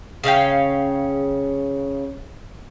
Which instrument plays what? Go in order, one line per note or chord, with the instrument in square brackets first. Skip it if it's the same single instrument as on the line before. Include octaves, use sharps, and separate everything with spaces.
[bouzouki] C#3 C#4 F5 G5